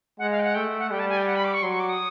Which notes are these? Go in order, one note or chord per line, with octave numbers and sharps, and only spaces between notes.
G#3 F#5
F5
G5
F#5
A3 G5
F#5
G3 G5
A5
G#5
G5
F#5
B5
D6
C#6
F#3 C6
C#6
D6
D#6